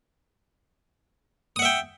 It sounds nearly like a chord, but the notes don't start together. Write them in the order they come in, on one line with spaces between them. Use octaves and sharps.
D#6 F#5 E5 G5